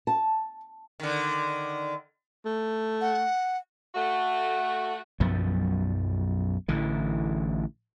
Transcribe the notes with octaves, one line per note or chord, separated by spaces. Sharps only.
A5
D3 D#3
A3
F#5
A3 F#4
B1 F#2 F3 B3
A1 D3 E3